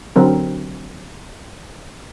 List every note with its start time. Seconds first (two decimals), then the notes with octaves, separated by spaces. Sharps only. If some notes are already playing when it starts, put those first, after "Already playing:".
0.16 D3 F#3 C4 A#4